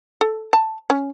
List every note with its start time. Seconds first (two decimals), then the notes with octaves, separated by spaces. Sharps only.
0.21 A4
0.53 A5
0.90 C#4